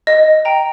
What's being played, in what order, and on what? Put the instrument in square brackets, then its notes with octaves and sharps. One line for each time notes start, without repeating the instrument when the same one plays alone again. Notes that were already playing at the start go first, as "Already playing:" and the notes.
[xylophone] D#5
G5 A#5